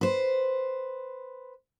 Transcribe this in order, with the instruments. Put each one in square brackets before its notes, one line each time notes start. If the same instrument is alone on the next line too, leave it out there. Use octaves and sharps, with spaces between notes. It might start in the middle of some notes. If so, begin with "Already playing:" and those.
[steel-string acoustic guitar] B4 C5